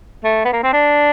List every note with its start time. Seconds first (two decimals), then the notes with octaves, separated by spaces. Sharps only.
0.24 A3
0.45 B3
0.53 A#3
0.63 C4
0.73 D4